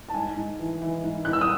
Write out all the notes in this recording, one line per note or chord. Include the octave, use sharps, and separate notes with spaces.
A5
G#2 G#5
G#2
E3
E3
G#2
G#2 F#6
E6
D#6